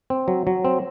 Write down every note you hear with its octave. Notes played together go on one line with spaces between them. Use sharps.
C4
F#3
F#3
C4